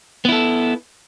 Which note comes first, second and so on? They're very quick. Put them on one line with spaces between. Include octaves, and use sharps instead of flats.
B3 E4 A4